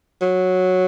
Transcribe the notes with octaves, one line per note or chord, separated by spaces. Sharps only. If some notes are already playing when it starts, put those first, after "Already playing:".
F#3